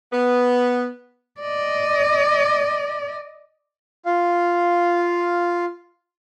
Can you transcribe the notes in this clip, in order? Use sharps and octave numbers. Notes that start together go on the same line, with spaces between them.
B3
D5 D#5
F4 F5